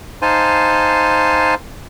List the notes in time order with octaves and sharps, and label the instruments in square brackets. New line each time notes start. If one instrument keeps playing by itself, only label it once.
[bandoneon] D#4 C5 F5 G#5 A5 C6